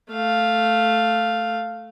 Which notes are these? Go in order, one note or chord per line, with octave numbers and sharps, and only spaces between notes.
A3 F5